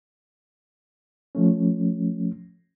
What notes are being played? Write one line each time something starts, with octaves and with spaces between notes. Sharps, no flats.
F3 A3 C#4